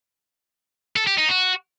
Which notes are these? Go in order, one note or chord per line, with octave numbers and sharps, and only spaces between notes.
A4
G4
D#4
F#4